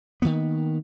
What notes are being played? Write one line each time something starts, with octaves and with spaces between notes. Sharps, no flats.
D#3 F3 A#3 B3